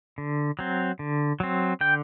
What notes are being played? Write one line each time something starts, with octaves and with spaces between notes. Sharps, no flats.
D3
F#3 C4
D3
F#3 C4
D3 G5